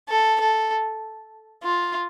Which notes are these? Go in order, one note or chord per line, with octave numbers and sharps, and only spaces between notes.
A4
A4
F4